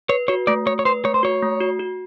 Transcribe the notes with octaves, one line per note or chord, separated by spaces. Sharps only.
B4 C#5
F#4 C#5
A3 D5
A3 C#5
C#5
B4 C5
A3 C#5
C5
F#4 C#5
A3
F#4
F#4